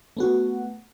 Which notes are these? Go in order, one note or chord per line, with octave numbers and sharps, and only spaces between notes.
A3 B3 F#4